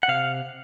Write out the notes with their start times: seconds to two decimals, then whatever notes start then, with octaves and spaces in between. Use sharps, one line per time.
0.03 F#5
0.08 C3 F5